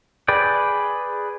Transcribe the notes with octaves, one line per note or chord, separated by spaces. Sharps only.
G#4 B4 D5 G5